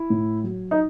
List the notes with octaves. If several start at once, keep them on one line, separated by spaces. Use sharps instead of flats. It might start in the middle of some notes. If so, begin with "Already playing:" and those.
Already playing: E4
A2
F#3
D#4